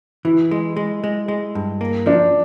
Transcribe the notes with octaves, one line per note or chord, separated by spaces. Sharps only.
E3 E4
G#3
G#3
G#3
G#3
G2
A#3
F3 D4